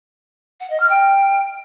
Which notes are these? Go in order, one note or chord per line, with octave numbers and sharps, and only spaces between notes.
F#5
D#5
F6
G5